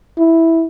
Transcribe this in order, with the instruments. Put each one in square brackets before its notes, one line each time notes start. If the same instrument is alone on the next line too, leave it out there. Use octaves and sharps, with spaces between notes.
[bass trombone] E4